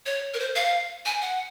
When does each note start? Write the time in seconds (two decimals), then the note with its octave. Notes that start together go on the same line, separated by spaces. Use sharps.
0.06 C#5
0.34 A#4
0.39 C5
0.56 F5
1.06 G#5
1.22 F#5